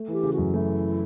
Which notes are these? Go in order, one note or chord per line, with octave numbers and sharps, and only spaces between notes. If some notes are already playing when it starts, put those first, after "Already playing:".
Already playing: A3
E3 G4
C#3
F#4
F#2
A3 E4